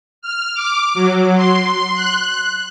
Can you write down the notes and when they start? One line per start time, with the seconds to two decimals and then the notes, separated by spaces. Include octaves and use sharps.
0.22 F6
0.55 D6
0.94 F#3
1.36 C6
1.94 F#6